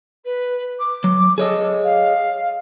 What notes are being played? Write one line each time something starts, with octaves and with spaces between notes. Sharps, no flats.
B4
D6
F#3
G#4 A4 C#5 D#5
F5